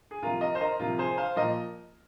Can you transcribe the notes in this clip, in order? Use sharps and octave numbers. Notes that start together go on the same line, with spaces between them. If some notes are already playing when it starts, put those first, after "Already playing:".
G#4
C2 C3 F3 F4 A#4
A#4 D#5
C5
A#4 D#5
C2 C3 F3 F4 A#4
G#4 C5
C5 F5
A#2 F3 A#4 D#5